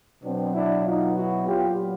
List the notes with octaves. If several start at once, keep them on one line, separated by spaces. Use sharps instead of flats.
B2 F#3 B3 C4 D4
D4 E4
D#4 F4
E4 F#4
A#2 F#3 B3 F4 G4